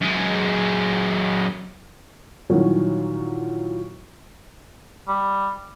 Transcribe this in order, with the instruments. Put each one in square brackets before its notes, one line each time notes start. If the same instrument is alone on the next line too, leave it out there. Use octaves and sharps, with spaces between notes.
[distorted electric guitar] F#2 G#3
[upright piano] A#2 D#3 E3 F#3 G3 C#4
[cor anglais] G3